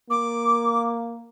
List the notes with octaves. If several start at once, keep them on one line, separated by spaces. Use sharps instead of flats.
A#3 D6